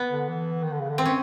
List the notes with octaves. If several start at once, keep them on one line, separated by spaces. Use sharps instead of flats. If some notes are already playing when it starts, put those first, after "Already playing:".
Already playing: B3
D3
E3
D#3
D3
C#3
D3
D#3 C4
C#4